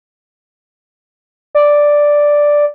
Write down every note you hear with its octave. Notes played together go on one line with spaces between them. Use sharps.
D5